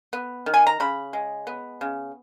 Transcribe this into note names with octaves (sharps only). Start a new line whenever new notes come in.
B3
D#3
G#5
A#5
C#3 B5
G#3
B3
C#3